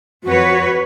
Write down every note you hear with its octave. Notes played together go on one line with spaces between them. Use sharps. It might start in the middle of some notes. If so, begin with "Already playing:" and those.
F2 F#4 B4 C#5